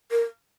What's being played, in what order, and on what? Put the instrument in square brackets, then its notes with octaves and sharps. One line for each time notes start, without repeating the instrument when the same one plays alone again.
[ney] A#4